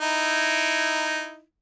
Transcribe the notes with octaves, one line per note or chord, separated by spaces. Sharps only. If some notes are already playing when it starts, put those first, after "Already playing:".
D#4 E4